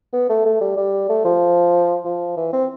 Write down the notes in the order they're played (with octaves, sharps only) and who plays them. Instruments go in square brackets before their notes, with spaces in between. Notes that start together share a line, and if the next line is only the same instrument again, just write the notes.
[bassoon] B3
A3
A3
G3
G3
A3
F3
F3
E3
C4